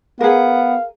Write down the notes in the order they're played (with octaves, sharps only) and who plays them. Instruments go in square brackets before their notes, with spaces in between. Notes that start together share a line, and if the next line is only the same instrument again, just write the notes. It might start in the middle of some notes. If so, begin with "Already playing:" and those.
[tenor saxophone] B3 [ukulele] G#4 A#4 [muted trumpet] F5